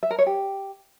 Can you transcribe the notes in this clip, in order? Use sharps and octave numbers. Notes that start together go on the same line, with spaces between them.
E5
A#4
C#5
G4